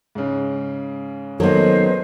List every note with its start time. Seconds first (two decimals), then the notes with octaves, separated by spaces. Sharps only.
0.15 G#2 C#3
1.40 D#3 F#3 A#3 B3 A4 B4 C5 D#5